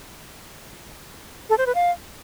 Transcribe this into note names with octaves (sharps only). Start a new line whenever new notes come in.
A4
C5
B4
F5